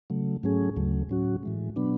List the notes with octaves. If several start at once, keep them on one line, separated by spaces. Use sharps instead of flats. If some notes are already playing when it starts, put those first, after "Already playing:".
C#3 F#3 A3
G#2 F#3 A3 C#4 G#4
D2 C#3 F#3 A3
A2 F#3 C#4 F#4
A2 E3 G#3
B2 F#3 B3 D4